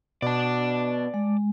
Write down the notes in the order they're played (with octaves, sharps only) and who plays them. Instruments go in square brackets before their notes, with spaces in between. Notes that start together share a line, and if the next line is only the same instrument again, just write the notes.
[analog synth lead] B2 [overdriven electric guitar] D5 A5
[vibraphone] G#3